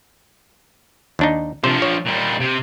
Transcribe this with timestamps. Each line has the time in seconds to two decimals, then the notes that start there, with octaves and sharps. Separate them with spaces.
1.19 D#2 D4 D#4
1.64 C3 F3 D4 C5
1.82 C#5
2.05 A#2 G3
2.40 C3